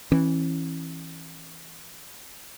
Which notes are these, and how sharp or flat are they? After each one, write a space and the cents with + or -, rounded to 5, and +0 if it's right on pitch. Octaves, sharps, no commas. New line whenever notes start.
E3 -5 C#4 -40